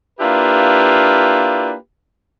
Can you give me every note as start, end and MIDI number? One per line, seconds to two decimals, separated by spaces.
0.19 1.72 58
0.19 1.72 62
0.19 1.72 64
0.19 1.72 65
0.19 1.72 67
0.19 1.72 71